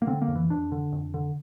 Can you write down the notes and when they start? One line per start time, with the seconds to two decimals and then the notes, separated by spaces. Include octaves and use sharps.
0.02 A#3
0.07 D3 C4
0.22 A#3
0.28 F2
0.35 E3
0.50 F2 D4
0.72 D3
0.92 F2
1.14 D3